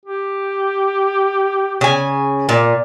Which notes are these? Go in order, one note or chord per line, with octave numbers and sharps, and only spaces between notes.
G4
C#3 G#5
A#2